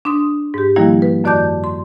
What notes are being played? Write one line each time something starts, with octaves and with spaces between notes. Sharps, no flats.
D4 C6 D#6
G#2 G4
D#3 F3 G3 A#3 E4
B4
F#2 D#3 D5 A5 D6 G6
C6